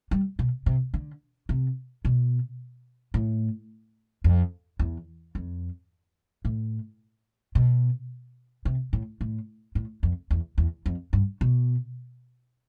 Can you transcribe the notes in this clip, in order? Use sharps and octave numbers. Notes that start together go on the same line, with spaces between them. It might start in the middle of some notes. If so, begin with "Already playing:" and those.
G3
B2
C3
D3
C3
B2
A2
F2
E2
F2
A2
B2
C3
A2
A2
A2
F2
E2
E2
F2
G2
B2